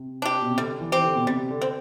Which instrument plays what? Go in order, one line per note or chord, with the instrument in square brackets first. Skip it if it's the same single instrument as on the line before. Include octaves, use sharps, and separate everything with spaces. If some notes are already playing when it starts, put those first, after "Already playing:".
Already playing: [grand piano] C3
[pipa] D4 G4
[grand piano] B2
C3
[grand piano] D3 [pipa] G3
[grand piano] E3
[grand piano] E3 [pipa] C4 G4
[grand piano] D3
B2
[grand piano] C3 [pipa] G3
[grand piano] D3
[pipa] C4